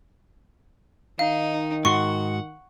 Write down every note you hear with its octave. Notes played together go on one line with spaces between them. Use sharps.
D#3 D#4 F5
G#2 F#4 F#5 C6 C#6